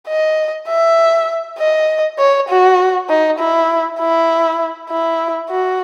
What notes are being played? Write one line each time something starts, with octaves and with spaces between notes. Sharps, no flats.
D#5
E5
D#5
C#5
F#4
D#4
E4
E4
E4
F#4